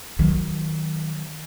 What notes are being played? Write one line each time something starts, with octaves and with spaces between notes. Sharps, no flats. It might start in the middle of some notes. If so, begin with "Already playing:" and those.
D#3 F#3